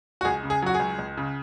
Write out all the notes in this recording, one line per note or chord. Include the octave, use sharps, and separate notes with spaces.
F#4
C#2 G#4
C#3
G#4
F#3 F#4
G#4
C#2
C#2
C#3